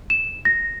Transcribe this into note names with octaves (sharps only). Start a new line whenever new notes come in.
E7
A#6